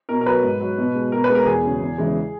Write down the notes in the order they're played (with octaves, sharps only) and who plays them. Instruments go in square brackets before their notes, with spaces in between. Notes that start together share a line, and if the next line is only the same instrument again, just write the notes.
[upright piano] B2 A#4
A#4
F#3 B4
G#2
F#3
B2
G#3
B2 A#4
B4
G#3
A#4
E2 G#4
C#3 F#3
E2
C#3 E3 G#3